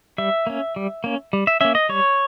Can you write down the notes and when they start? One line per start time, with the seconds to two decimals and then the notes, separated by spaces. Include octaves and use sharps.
0.18 G3 E5
0.47 A#3 C#4
0.76 G3
1.04 A#3 C#4
1.33 G3
1.47 E5
1.61 A#3 C#4 E5
1.75 D#5
1.89 G3 C#5